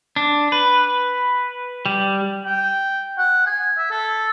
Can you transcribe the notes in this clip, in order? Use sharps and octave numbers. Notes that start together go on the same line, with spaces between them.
D4
B4
G3
G5
F#5
G#5
E5
A4